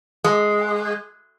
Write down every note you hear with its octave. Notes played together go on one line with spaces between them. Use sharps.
G#3